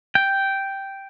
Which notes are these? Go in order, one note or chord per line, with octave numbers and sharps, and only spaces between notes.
G5